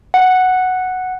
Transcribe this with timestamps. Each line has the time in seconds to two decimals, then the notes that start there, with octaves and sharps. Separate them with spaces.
0.14 F#5